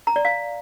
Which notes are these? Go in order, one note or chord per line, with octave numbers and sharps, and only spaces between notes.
A#5
D5
F5